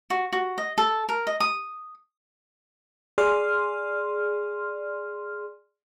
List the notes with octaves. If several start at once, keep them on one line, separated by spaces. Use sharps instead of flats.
F#4
F#4
D#5
A4
A#4
D#5
D#6
G#4 D5 C6 F6